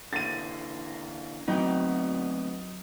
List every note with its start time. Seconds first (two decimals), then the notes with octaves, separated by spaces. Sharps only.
0.13 D3 E3 A#3 A6 D#7
1.48 D2 F#3 B3 C4 D#4 G5 D7